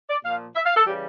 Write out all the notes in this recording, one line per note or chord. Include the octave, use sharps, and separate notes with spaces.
D5
A#2 F3 F5
E5
F5
A4
C#3 E3 G3 G4